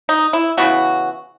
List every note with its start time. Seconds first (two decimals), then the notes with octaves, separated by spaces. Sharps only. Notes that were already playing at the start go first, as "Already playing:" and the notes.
0.09 D#4
0.33 E4
0.57 C#3 E3 B3 F#4